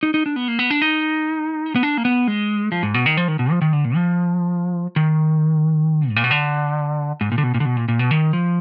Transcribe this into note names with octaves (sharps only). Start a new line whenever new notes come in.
D#4
D#4
D4
B3
A#3
B3
D4
D#4
B3
D4
A#3
B3
G#3
F3
G#2
B2
D#3
F3
D#3
B2
F3
D#3
D3
A#2
F3
D#3
G#2
A#2
B2
D3
G#2
A#2
D3
B2
A#2
D3
B2
A#2
A#2
B2
D#3
F3